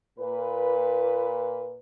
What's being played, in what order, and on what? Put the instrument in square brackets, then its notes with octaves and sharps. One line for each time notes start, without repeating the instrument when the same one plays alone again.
[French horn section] A#2 B4